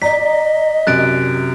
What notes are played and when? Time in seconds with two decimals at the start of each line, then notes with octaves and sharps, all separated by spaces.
0.02 D5 D#5 A#5 B6
0.87 F#2 C3 F#6 A6 D7